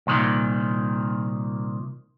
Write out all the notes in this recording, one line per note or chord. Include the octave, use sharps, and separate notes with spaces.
C2 A#2 D#3